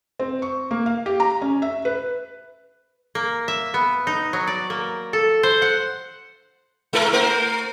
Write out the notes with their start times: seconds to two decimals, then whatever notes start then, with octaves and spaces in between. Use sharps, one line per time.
0.19 C4
0.42 C#6
0.71 A#3
0.86 F5
1.06 G4
1.20 A#5
1.42 C#4
1.62 E5
1.85 B4
3.15 A#3
3.48 E5
3.74 B3
4.07 D#4
4.33 F#3
4.47 D5
4.70 A#3
5.13 A4
5.43 C5
5.62 F#5
6.93 G#3 E4 A#4
7.13 A3 A#4 C5